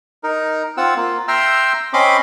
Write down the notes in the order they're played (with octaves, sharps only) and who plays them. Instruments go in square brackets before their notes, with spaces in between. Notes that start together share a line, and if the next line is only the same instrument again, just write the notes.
[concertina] D#4 A#4
C4 F4 F#5 E6
A#3 F4
E5 G5 A#5 C6 E6 F6
C4 C#4 D#5 B5 C6 D6